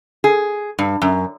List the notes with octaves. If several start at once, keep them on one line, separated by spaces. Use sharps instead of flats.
G#4
G2
F#2